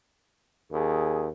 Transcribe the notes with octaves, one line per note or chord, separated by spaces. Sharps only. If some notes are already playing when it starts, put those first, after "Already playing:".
D#2 G#4